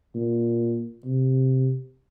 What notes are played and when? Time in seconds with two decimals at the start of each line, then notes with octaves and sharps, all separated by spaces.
0.14 A#2
1.05 C3